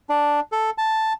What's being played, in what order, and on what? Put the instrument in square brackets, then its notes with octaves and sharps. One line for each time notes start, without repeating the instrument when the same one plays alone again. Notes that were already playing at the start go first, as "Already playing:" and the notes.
[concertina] D4
A4
A5